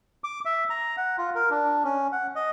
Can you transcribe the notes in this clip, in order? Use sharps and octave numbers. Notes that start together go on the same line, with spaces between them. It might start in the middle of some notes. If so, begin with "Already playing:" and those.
D6
E5
A#5
F#5
F4
A#4
D4
C#4
F#5
D#5